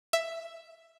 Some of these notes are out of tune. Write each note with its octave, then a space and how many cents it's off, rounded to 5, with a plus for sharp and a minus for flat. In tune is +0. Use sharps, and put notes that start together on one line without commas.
E5 +5